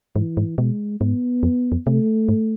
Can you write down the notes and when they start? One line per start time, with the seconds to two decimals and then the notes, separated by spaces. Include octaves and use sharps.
0.16 G#2 E3
0.37 G#2
0.58 B2 G#3
1.01 G#2 B3
1.43 F2
1.72 F2
1.87 C3 A3
2.29 G#2